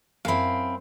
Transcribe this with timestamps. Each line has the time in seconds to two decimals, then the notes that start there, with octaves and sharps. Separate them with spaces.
0.25 F#2 C4 E4 F5